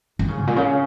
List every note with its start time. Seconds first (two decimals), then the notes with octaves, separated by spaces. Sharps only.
0.19 D#3
0.28 C#3
0.37 G#2
0.47 A#2
0.56 C#3